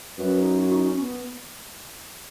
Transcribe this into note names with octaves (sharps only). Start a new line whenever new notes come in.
F#2 B4
D#4
F#4
D#4
C#4
B3